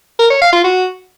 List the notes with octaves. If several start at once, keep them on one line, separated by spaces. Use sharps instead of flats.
A#4
C#5
F5
F4
F#4